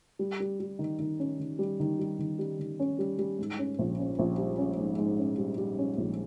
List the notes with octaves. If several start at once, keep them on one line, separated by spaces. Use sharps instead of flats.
G3
G3
G3
D#3
D#3
C#4
D#3
G3
D#3
G3
D#3
G3
D#3
C#4
G3
G3
G#2
C#4
A#1
C#4
A#1
G3
C#4
G#2
G#2
C#4
G3
G3
C#4
A#1